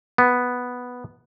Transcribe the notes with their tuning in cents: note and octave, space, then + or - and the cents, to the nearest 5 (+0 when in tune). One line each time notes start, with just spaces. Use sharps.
B3 +0